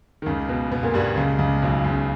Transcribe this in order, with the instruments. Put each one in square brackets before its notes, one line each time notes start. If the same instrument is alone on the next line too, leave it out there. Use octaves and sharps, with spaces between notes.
[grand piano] D#3
C#2 C#3
B2 B3
B2 B3
A#2 A#3
G2 G3
C#2 C#3
C#2 C#3
B1 B2
C#2 C#3